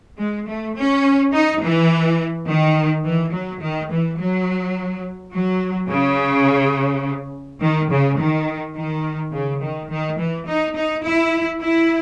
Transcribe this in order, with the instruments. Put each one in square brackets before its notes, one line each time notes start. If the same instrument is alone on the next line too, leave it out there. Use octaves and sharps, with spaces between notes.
[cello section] G#3
A3
C#4
D#4
E3
D#3
E3
F#3
D#3
E3
F#3
F#3
C#3
D#3
C#3
D#3
D#3
C#3
D#3
D#3
E3
D#4
D#4
E4
E4